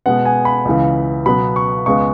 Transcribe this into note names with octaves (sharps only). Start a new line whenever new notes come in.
B2 G#3 B3 F#5
G#5
B5
C#2 C#3 E3
B2 F#3 B3 B5
C#6
C#2 C#3 G#3 B3 C#6